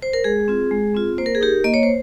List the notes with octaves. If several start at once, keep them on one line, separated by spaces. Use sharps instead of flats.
C5
A#4
G#3 G#4
C4 F4
G#3
C4 F4
A#3 C5
A#4
G#4
D#4 G4 A#4
A#3 D#5
C#5
C5